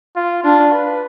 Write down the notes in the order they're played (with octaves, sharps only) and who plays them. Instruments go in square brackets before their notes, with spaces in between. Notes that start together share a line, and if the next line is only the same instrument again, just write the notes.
[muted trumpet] F4
[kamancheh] D4 [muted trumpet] F4
[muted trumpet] B4